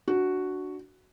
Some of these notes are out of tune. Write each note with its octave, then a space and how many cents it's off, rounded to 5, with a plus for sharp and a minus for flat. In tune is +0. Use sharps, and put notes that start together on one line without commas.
D4 +0 F#4 +0